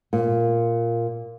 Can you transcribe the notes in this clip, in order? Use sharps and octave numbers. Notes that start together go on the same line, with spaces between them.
A#2